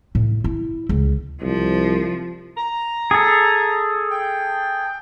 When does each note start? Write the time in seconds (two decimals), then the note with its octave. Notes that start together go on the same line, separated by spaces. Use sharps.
0.15 A2
0.44 E4
0.89 C#2
1.42 C2 F3
2.57 A#5
3.11 G#4 A4
4.10 G5